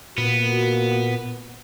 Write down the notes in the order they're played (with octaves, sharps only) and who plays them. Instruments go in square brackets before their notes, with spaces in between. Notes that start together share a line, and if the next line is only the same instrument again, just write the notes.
[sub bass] A#2 [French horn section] A#3 F#4 [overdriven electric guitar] B3